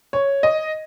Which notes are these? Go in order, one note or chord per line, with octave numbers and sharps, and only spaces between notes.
C#5
D#5